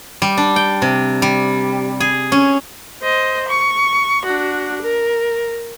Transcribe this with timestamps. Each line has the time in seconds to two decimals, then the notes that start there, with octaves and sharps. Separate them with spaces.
0.22 G3
0.37 D4
0.56 G5
0.82 C3
1.22 G3
2.00 G#4
2.32 C#4
3.03 C5 D#5
3.49 C#6
4.26 D4 F#4
4.82 A#4